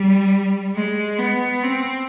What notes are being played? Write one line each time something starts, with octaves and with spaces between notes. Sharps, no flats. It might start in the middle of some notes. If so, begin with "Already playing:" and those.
Already playing: G3
G#3
B3
C4